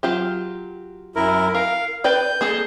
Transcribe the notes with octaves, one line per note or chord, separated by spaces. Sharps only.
F#3 F4 G4
F#2 E4 A#4
A#4 F5
B4 D5 G5 G6
A#3 G#4 A4